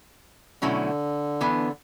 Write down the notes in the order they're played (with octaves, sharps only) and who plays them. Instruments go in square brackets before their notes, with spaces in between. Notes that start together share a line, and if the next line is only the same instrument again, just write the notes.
[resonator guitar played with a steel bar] B2 F#3 A3 C#4 E4 [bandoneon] D3
[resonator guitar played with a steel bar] E3 B3 D4